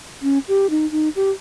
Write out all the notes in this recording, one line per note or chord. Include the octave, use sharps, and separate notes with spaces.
C#4
G4
D#4
D#4
G4